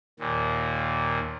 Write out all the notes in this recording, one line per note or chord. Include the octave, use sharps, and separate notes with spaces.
D#2 A#2